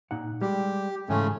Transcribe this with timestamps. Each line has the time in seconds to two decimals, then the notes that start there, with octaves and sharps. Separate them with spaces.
0.11 A#2 D#4 F#5
0.41 G3 G#3 G4
1.09 G#2 C#3 E3 G#3 A3 C#4